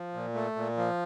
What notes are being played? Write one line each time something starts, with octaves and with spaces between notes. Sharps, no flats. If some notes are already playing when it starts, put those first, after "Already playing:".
Already playing: F3
A#2
A3
A#2
F3